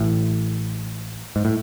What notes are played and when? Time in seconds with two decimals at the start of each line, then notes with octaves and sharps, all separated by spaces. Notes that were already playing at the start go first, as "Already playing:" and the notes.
Already playing: A1 A2
1.36 G#2
1.45 A2